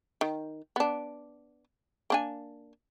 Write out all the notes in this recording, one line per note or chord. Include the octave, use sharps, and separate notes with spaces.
D#3
B3 D4
A#3 D4 G#5